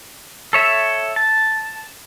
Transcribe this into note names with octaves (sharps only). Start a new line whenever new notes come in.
A4 C#5 E5
A5